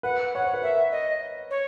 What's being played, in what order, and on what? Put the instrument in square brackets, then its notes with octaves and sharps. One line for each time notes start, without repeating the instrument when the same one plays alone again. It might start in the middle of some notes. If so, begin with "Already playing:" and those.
[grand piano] B4 [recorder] F#5
[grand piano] C#5 [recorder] F#5
[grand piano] C5
B4
[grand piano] A#4 [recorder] E5
[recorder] D#5
C#5